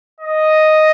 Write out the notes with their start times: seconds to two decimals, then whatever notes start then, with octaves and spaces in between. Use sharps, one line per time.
0.20 D#5